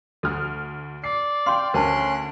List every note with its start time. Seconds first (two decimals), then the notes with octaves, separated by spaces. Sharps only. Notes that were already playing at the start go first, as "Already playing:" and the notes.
0.23 D2 A4 F6
1.04 D5 C7
1.46 F5 G5 C6
1.74 D2 C#4 A#4 C5 A5 C6 F#6